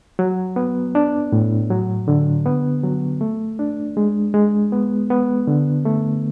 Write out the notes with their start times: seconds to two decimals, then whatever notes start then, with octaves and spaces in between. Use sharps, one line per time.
0.19 F#3
0.56 B3
0.95 D4
1.32 A2
1.70 F#3
2.08 D3
2.46 B3
2.84 F#3
3.21 A3
3.59 D4
3.97 G#3
4.34 G#3
4.72 B3
5.10 B3
5.47 D3
5.85 A3